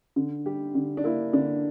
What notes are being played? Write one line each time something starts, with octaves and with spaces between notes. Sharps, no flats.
D3
G3 G4
D3
D4
A#3 E4
D3 D4